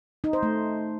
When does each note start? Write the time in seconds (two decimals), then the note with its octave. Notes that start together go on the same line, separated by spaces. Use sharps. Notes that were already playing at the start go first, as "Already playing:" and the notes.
0.24 D#4
0.33 C5
0.43 A3